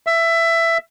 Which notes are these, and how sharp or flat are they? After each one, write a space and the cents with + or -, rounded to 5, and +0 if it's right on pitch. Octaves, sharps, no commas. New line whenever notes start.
E5 +15